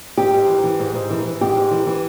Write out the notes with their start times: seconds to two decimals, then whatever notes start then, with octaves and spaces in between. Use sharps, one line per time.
0.17 G#2 G4
0.33 G#2
0.48 E3
0.63 E3
0.79 G#2
0.95 G#2
1.10 E3
1.25 E3
1.41 G#2 G4
1.56 G#2
1.71 E3
1.86 E3